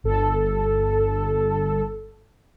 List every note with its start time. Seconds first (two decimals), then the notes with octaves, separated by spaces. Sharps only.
0.04 G1 A4